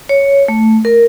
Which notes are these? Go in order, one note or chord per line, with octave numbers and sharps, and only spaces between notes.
C#5
A3
A#4